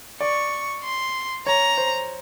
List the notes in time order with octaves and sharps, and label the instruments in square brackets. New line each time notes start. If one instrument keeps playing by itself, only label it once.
[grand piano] D5 [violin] C#6
[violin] C6
[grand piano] C#5 [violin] A#5
[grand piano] C5